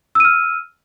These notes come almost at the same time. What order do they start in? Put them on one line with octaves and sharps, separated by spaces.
E6 D#7 F6